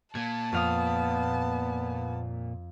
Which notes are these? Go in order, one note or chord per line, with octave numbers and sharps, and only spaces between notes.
A#2 A#3 A5 G#6
F2 B3 F5 D#6